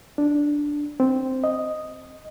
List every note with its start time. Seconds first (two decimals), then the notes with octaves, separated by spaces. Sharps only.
0.18 D4
1.00 C4
1.44 D#5